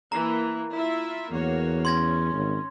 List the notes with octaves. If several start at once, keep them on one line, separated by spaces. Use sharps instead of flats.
E3 A#3 A#5
E4 F4 E5
E2 A#3 F#4 C#5
C#4 C6 G#6 A#6
G#1